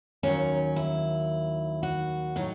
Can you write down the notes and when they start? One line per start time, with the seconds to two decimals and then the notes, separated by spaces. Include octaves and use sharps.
0.23 D#2 D#3 F#3 C#4
0.76 E4
1.83 F#4
2.36 A2 F#3 D#4